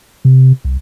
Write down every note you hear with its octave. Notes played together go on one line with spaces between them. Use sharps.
C3
C2